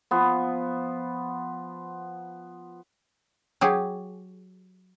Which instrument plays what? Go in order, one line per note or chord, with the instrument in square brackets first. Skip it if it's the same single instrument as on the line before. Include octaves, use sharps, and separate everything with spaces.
[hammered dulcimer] F3 B3
[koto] F#3 G4 G#4